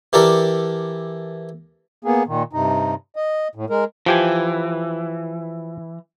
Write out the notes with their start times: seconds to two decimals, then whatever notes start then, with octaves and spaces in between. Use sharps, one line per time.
0.13 E3 G4 A4 A#4 D5
2.05 A#3 B3 G#4
2.27 A#2 D#3
2.53 G2 C3 D#4
3.16 D#5
3.55 A2
3.70 G#3 A#4
4.06 E3 F3 G4 G#5